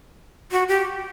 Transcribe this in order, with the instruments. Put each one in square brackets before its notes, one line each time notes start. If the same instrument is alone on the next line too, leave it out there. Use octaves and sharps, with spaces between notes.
[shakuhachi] F#4
G4